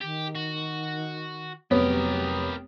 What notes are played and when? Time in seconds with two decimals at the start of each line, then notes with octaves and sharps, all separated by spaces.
0.01 D#3 G4
0.35 F#4
1.71 F1 F#3 B3 G4 A#4 C#5